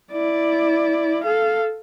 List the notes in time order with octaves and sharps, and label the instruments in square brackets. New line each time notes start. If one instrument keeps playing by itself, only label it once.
[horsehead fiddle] E4 D5
A4 F5